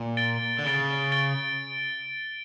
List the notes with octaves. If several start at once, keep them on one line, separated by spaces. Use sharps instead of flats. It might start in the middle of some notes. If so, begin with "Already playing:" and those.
Already playing: A#2
A6 D7 G7
D3
C#3 A6 D7 G7
A6 D7 G7